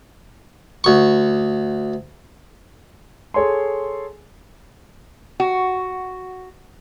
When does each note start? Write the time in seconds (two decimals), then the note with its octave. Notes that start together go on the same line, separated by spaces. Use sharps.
0.84 D2 C#6
3.34 G#4 A4 C#5 G#5 C6
5.40 F#4